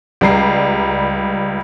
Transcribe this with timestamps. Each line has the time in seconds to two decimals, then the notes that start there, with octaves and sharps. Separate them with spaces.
0.21 C#2 G3 A#5 C7